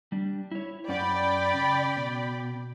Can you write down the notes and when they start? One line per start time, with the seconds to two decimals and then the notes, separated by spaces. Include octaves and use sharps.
0.12 G3 D4
0.51 E4 C#5
0.88 F#2 C#4 D5 F#5 G5 B5
1.54 C#3
1.97 B2